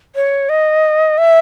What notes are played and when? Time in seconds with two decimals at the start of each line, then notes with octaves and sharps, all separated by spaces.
0.15 C#5
0.49 D#5
1.18 E5